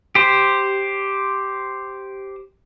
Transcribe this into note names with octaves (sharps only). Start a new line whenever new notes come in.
G4 C5